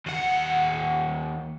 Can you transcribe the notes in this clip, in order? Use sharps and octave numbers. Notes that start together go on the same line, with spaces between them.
D#2 F#5